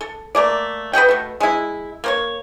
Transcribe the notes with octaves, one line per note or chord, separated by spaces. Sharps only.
A4
A3 A#3 D5
B4 D#5 F#5 G5
B2 A3
G#3 E4
A#3 C5 C#5